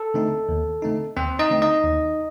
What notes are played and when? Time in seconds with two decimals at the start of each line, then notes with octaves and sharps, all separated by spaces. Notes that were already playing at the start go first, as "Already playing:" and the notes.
Already playing: A4
0.14 D3 A3 C4 D#4
0.49 D#2
0.82 D3 A3 C4 D#4
1.16 D#2 C4 C5
1.39 D#4 D#5
1.50 D3 A3 C4 D#4
1.62 D#4 D#5
1.84 D#2